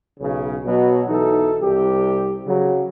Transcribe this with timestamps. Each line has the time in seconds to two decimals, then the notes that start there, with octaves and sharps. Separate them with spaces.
0.20 B1 C#3
0.64 B2 F#3
1.08 B1 E3 D#4 A4
1.59 C2 G4
2.46 C#3 F#3